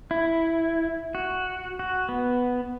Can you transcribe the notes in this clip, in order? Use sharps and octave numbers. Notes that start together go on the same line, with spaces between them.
E4
F#4
F#4
B3